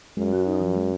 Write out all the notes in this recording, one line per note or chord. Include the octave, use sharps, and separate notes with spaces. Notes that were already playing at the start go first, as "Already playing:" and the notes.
F#2 G#3
F#4
D#4
F3
G#3